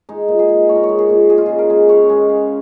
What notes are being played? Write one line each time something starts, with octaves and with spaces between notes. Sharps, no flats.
G#3 D#4
A#2
G#4
G#3
A#2 C#5
A#4
C#5
G#3
G#4
A#2
G#3 G#4
F4
C#3 G#4
A#4
G#3
C#3 C#5
G#3
C#3